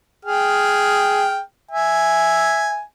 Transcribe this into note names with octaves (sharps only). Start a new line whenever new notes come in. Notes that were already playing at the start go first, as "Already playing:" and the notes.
G#4 G5 F6
E5 G#5